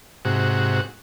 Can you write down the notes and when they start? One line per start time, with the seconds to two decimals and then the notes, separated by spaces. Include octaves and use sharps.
0.25 G#2 C3 F#4